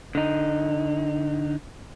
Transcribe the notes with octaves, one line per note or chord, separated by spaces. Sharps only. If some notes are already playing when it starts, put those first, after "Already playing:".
D3 D#4